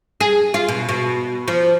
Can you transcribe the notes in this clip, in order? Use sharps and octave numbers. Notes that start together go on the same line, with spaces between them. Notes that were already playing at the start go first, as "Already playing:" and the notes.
G#4
F4
B2
B2
F3